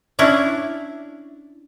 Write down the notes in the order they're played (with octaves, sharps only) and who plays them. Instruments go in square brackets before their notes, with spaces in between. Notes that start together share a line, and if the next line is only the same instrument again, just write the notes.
[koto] C#4 D4 E4